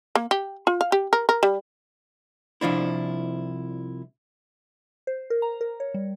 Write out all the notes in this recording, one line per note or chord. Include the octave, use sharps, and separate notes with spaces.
A#3
G4
F4
F5
G4
A#4
A#4
G3
C2 F3 D4 E4
C5
A#4
A#5
A#4
C#5
G3